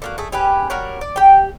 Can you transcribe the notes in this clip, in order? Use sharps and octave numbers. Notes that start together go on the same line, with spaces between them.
D3 A#3 F#4
A3 G#4
C#4 G4 G#4 B4
G3 F#4 A#4 C#5
D5
G4 G5